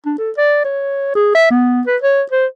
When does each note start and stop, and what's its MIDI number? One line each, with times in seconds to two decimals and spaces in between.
0.06 0.13 62
0.18 0.31 69
0.37 0.62 74
0.65 1.13 73
1.15 1.30 68
1.35 1.47 76
1.51 1.82 59
1.87 1.97 71
2.02 2.23 73
2.31 2.46 72